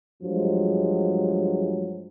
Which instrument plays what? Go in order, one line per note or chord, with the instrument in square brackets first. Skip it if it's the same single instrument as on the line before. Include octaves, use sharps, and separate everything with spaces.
[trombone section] G2 F3 F#3 G#3